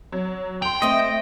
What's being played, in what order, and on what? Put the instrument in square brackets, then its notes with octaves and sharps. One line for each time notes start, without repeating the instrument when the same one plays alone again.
[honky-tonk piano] F#3
[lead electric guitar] G5 [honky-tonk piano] C6 F7
[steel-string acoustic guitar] A3 C4 [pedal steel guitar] D#5